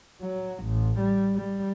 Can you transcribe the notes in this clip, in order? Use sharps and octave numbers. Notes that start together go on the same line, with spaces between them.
F#3
A1
G3
G3